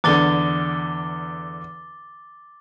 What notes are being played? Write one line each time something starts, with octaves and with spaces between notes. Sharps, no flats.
E2 D3 D6 A6 G7